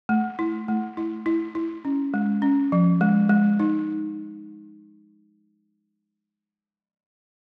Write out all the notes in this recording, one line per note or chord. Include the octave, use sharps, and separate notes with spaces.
A3
E4
A3
E4
E4
E4
C#4
G#3
C#4
F3
G#3
G#3
D#4